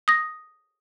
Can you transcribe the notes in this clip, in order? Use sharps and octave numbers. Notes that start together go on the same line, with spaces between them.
D#6 A#6